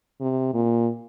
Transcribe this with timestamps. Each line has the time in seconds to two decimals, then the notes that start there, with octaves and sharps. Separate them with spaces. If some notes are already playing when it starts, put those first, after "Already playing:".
0.21 C3
0.54 A#2